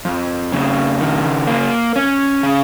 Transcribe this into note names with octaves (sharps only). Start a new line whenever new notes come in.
F2
C#3
D#3
A#3
C#4
C#3